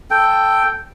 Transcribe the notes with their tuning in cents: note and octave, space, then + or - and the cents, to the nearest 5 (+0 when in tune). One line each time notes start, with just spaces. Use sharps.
A4 +0 G5 +0